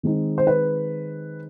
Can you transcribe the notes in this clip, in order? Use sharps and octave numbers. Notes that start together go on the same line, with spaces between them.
D#3 G#3 C4 D#4
C5
B4